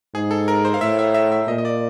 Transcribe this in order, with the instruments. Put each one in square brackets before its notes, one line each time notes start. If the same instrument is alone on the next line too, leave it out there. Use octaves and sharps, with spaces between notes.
[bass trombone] G#2 [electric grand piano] G#4
[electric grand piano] A4
A#4
C5
F5
[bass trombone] A2 [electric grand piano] E5
[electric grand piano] E5
E5
E5
[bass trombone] A#2 [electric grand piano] D#5
[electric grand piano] D#5
D5